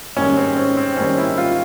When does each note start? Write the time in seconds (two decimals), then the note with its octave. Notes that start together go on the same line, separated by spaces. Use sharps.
0.16 G#2 D#3 G3 C#4
0.37 C4
0.57 C#4
0.77 C4
0.96 G#2 D#3 G3 C#4
1.17 E4
1.38 F4